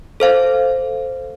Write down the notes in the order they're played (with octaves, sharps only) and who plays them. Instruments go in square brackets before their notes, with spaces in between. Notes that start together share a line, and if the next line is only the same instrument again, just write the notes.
[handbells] A4 C5 F5